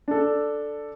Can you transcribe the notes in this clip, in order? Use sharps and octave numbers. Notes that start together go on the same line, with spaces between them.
D4 A4